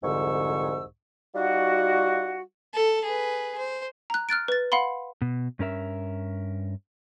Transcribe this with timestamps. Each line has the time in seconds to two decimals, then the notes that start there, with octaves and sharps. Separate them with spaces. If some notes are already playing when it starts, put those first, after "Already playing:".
0.04 C2 F2 G#2 D3 C#6 E6
1.35 G3 D#4 F4 F#4
2.74 A4
3.05 G#4 B4
3.58 C5
4.10 A#5 F#6
4.29 F6 F#6 A6 D7
4.48 B4 A6
4.72 F5 F#5 B5 C6
5.22 B2
5.59 G2 C#4 A#4 E5